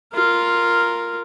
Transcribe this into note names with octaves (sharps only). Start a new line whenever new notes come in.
F4 A#4